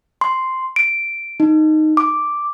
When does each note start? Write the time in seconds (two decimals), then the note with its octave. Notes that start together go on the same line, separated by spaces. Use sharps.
0.21 C6
0.76 D7
1.40 D#4
1.97 D6